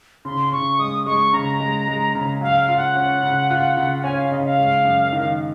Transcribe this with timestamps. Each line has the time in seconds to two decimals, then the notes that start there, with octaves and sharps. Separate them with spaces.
0.25 C#3 C6
0.52 C#3 C#6
0.79 G#3 D#6
1.06 G#3 C#6
1.33 C#3 A#5
1.60 G#3
1.88 G#3
2.15 C#3
2.41 F#3 F5
2.60 F5
2.69 F4
2.77 F#5
2.96 C#4
3.23 C#3
3.50 F4
3.77 C#3
3.99 F#5
4.04 C#4 G#5
4.17 F5
4.31 C#3 D#5
4.44 F5
4.59 G#3
4.85 F#2
5.12 D#3